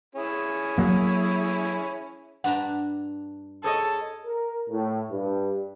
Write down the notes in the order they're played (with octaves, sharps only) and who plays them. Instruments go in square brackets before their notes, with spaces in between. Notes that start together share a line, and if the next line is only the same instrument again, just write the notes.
[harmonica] C#4 E4 G#4
[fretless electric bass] F#3 A#3
[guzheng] G2 D4 A#5 [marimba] F#5
[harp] G#4 C#5 D#5 [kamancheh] A4
[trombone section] A#4
A2
G2